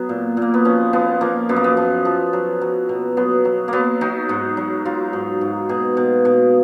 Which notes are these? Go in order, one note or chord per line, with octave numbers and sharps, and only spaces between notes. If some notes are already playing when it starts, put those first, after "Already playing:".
Already playing: F#3 B3
A#2
A#2 A#3
B3
F3 C#4
F3 B3
F3 A#3
F#2 B3
A#3
B3
F3
F3
F#3
F#3
B2
F#3 B3
F#3
F#3 A#3 B3
F#3 D#4
G#2
F#3
F#3 F4
G#2
G#2
B2 G#4
B2
B2